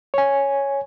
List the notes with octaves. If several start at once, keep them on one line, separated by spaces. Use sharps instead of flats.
C#5 G#5